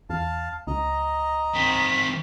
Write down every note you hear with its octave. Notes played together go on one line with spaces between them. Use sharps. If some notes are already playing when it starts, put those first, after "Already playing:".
E2 F5 A5
C#2 D#5 A#5
D#3 C4 B6